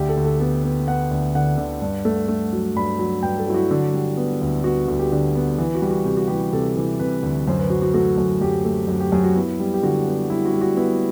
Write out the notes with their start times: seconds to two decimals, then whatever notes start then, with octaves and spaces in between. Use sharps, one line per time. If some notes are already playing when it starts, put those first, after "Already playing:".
Already playing: D2 G4
0.09 A4
0.17 D2
0.25 A4
0.40 B3 A4
0.64 B3
0.87 B3 F#5
1.11 D2
1.35 D3 F#5
1.58 D3
1.82 G2
2.05 A3
2.28 A3
2.53 F#3
2.76 G2 B5
2.99 F#3
3.23 G2 G5
3.39 A4
3.47 F#3 E4
3.54 F#4
3.71 D3
3.94 G3
4.17 B3
4.41 D2
4.64 B3 F#4
4.88 D2 F#4
4.99 G4
5.12 D3 F#4
5.35 B3
5.58 E3
5.75 F#4
5.82 G3
5.90 F#4
6.05 C3 G4
6.17 F#4
6.28 E3 G4
6.53 C3 A4
6.77 E3
6.99 C3 B4
7.23 D2
7.48 F#2 C5
7.59 B4
7.70 F#3 F#4
7.82 F#4
7.94 A3 F#4
8.18 F#2
8.41 F#2 G4
8.65 A3
8.88 F#2 F#4
9.00 G4
9.12 F#2 G4
9.24 F#4
9.36 B3 E4
9.60 G3
9.74 G4
9.83 D3 F#4
10.07 B3
10.29 G3 E4
10.45 F#4
10.53 G3
10.61 F#4
10.77 B3 E4